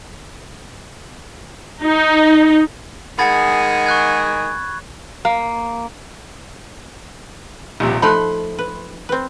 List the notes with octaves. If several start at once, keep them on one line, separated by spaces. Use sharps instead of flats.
D#4
D#3 G#3 G#4 F#5 B5 G#6 A6
C#6 F#6 G#6
A#3
D#1 A#1 C3
F3 A3 D#4 B5 C6 F#6
B4
C4 B4